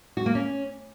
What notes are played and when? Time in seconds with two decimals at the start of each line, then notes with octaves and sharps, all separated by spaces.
0.17 F#4
0.26 A#3
0.35 C#4